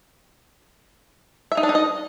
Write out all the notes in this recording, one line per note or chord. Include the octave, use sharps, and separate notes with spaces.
E5
D#4
D4
D#4
D#5